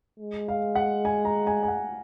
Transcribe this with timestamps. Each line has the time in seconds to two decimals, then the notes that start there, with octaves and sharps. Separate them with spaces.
0.19 G#3
0.48 F5
0.75 F#5
1.05 G#5
1.25 A#5
1.47 G#5
1.63 G#5
1.68 F#5